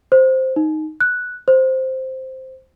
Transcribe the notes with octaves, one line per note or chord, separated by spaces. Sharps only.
C5
D#4
F#6
C5